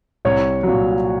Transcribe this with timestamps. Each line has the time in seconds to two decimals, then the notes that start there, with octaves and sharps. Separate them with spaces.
0.25 C2 C#5
0.63 A#2 F#3